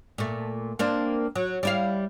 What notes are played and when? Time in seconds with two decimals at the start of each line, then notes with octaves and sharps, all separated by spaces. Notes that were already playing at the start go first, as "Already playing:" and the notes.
0.18 A#2 A3
0.79 A#3 C4 D4
1.36 F#3
1.63 G3 E4 F5